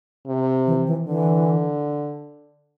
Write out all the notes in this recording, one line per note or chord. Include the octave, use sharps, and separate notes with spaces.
C3
E3
E3
D3 E3